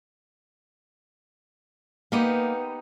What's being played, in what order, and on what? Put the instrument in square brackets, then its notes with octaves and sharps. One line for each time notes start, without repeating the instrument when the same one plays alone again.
[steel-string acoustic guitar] A#3 [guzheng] B3 D#4 G4